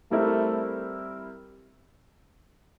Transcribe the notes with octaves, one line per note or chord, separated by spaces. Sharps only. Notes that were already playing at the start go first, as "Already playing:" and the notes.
G3 A3 C4 E4 A#4